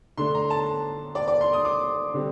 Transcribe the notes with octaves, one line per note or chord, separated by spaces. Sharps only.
D3 A3 D4 C6
A#5
A5
D5
D5
C6
D#6
D6
D3 G3 C4